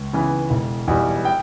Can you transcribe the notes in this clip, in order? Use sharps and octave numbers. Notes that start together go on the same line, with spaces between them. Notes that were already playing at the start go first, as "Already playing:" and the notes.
Already playing: C#2
C#3 E3 B3
E1
E2 B2 G3
G5